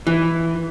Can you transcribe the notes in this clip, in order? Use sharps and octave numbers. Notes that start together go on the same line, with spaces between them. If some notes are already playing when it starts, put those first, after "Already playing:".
E3